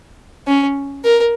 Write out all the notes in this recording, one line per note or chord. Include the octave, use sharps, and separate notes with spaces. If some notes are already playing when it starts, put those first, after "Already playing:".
C#4
A#4